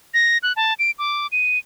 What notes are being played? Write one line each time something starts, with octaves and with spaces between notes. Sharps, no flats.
A#6
F#6
A5
D7
D6
D#7